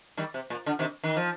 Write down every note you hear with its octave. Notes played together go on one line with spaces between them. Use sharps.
D#3 G3
C3
A#2
D3
C3 D#3
D#3
F3